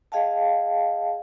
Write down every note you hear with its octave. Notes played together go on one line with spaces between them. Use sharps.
G#4 D#5 F5 G5 A5